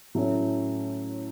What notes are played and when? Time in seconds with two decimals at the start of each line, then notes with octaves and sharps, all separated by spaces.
0.15 A2 F#3 A3 C#4 E4